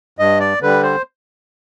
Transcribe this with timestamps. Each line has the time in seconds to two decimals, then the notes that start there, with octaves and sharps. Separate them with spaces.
0.19 G2 D#5
0.40 D5
0.61 D3 G3 B4
0.83 C5